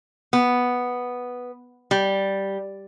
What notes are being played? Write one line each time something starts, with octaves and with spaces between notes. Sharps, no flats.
B3
G3